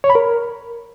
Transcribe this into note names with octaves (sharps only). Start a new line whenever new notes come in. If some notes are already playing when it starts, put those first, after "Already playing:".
C#5
B5
A#4